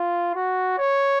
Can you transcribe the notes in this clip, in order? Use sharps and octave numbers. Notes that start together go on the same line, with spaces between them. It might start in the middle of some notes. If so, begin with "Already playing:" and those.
Already playing: F4
F#4
C#5